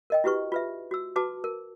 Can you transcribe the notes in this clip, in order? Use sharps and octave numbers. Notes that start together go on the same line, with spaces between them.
A#4 D#5 G5
E4 F#4 G4 B4 C#6
F4 B4 E5
F#4 E6
F#4 B4 A5 D6
A#4